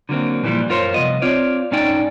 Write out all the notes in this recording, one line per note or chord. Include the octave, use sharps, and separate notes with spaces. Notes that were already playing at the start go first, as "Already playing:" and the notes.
D3 F#3 A#3 C4
A#2 E3 F3 G3
F#2 F4 A#4 C5 C#5
C2 F3 B3 D#5
C4 F4 C#5 D5
G#2 C#4 D#4 D5 G5